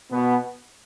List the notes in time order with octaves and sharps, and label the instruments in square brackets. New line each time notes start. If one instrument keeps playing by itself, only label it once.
[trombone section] B2 B3